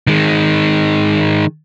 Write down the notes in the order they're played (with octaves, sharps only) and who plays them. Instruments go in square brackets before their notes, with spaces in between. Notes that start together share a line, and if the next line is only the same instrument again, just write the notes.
[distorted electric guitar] D#3 G#3